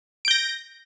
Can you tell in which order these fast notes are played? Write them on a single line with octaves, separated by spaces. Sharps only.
D7 G6 A#6